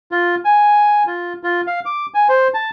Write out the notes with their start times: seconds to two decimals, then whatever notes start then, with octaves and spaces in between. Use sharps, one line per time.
0.11 F4
0.45 G#5
1.07 F4
1.43 F4
1.67 F5
1.85 D6
2.14 G#5
2.29 C5
2.54 A5